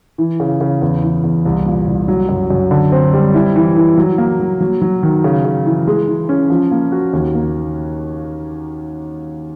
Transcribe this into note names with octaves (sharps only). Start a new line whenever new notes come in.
E3
C#3
C#3
E2
E3
E2
C2
A#2
C2
F#3
F#2
F#2
D3
C4
G3
E4
E3
E3
F#3
A#3
F#3
F#3
F#3
D#3
C#3
C#3
E3
G#3
E3
C#4
F3
A#3
F#4
D#2
A#3